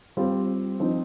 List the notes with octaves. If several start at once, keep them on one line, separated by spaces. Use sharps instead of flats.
G3 C4 F4
F3 C4 D#4